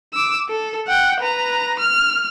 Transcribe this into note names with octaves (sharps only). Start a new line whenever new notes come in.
D6 E6
A4
F#5 G5
B4 A#5
F6